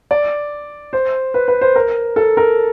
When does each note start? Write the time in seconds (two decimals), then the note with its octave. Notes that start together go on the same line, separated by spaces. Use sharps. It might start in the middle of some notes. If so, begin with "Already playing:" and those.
0.11 D5
0.93 C5
1.34 B4
1.48 B4
1.61 C5
1.76 A#4
2.16 A4
2.37 A#4